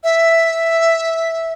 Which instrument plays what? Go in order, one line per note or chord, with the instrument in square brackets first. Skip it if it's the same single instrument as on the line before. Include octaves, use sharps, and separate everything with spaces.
[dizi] E5